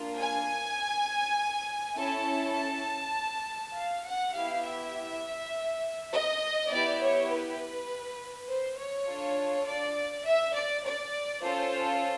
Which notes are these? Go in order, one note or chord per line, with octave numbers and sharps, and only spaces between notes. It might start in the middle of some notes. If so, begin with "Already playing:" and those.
Already playing: A#3 D4 F4
G#5
C#4 E4 A4 A5
A5
F5
F#5
B3 E4 G4 F5
E5
D#5
B3 E4 G4 D5
C#5
B4
C5
C#5
D4 F4 A4
D5
E5
D5
D5
C#4 F4 A4 C5